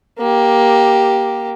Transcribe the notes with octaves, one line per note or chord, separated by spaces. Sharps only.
A#3 G4